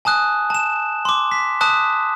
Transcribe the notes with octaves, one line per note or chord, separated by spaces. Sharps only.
G#5 A5 D#6 F#6
A5 E7
C6 D6
B6
A5 D#6 F#6